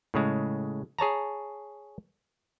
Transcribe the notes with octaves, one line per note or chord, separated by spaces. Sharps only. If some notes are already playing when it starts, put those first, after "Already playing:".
A2 C#3 G#3
G#4 C#5 A5 A#5